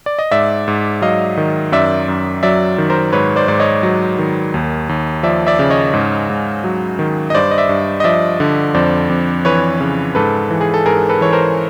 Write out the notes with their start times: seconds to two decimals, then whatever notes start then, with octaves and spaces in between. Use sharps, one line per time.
0.06 D5
0.19 D#5
0.31 G#2 D5 E5
0.68 G#2
1.02 F#3 D#5 F5
1.37 D#3
1.72 F#2 D5 E5
2.08 F#2
2.43 F#3 D5 E5
2.78 D#3
2.90 A#4 C5
3.12 G#2 B4 C#5
3.36 C5 D5
3.48 G#2 D5
3.60 C#5 D#5
3.83 F#3
4.18 D#3
4.54 D#2
4.89 D#2
5.23 F3 D5 E5
5.47 D5 E5
5.59 C#3
5.70 C#5 D#5
5.94 G#2
6.30 G#2
6.64 F#3
6.99 D#3
7.30 D#5
7.34 G2 C5 D5
7.51 D#5
7.58 D5 E5
7.69 G2
8.00 D#5
8.04 F3 D5 E5
8.40 D3
8.74 F2 C5 D5
9.09 F2
9.45 E3 B4 C#5
9.81 C#3
10.15 G#2 A4 B4
10.51 E3
10.61 G#4
10.74 A4
10.86 G#2 G#4 A#4
11.09 A4 B4
11.21 E3 C#5
11.32 A#4 C5